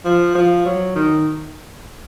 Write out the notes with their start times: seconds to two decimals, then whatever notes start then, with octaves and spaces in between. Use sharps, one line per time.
0.05 F3
0.35 F3
0.66 F#3
0.95 D#3